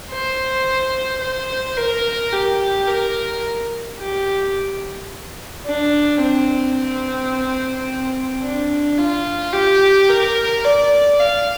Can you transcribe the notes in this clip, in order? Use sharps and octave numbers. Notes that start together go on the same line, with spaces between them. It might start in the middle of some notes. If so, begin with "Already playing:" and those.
C5
C5
A#4
G4
A#4
G4
D4
C4
D4
F4
G4
A#4
D5
F5